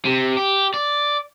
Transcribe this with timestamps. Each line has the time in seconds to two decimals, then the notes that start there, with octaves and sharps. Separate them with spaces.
0.05 C3
0.37 G4
0.74 D5